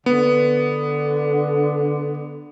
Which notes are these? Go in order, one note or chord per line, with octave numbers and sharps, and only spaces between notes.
D3 B3